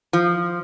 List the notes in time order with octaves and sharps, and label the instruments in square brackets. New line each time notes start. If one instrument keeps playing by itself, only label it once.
[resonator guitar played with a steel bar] F3